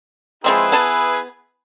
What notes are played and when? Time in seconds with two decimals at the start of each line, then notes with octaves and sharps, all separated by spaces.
0.44 F3 G#3 C4 E4 G#4 B4
0.72 B3 G#5 A5